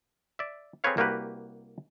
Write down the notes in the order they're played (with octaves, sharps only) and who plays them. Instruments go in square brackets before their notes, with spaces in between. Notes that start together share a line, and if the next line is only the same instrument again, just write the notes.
[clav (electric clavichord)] D5 E5
C4 G#4 A4 B4 C#5 F5
C2 A#3 F#4 G4 B4